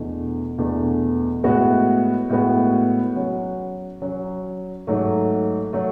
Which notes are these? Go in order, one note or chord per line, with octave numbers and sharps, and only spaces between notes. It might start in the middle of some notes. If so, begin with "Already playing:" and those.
Already playing: E2 B2 A3 D4
E2 B2 A3 D4
A2 G#3 B3 F#4
A2 G#3 B3 F#4
F#3 C#4 F#4
F#3 C#4 F#4
G#2 F#3 A3
F#3 A3